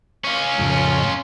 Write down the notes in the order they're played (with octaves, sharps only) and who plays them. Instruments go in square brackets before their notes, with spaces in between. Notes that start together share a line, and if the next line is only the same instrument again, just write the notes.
[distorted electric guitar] C#4 F4
[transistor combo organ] F2 A2 C#3